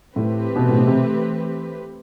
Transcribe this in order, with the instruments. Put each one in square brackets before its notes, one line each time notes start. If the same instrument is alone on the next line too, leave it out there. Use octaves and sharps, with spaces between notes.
[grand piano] A2 [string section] E3 A3 C4 G4 B4
[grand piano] B2
A2
B2
C3